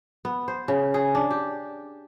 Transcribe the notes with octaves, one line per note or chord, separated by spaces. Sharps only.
B3
C5
C#3
G#4
D4
G4